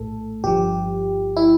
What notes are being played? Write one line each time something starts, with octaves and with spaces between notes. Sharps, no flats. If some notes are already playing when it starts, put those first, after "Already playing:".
Already playing: A#1 A2 A3 A4
G1 G2 F3 G4
E4